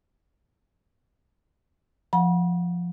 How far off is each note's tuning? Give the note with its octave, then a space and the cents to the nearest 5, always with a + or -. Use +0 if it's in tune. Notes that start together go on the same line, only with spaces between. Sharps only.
F3 +0 F#5 -10 B5 -35